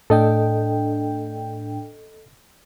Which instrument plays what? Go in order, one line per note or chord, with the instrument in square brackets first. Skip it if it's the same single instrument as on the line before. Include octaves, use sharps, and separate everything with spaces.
[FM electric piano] A2 D4 G5 [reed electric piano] A4 D#5